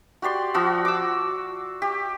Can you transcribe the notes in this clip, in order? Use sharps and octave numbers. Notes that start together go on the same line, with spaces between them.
F#4 G4 D5 C6
F3 F#4 E6
D6 E6
G4